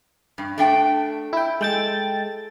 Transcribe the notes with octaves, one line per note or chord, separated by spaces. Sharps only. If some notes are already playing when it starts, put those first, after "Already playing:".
G2
A3 D4 G5
E4 G5
G#3 A4 G5 A6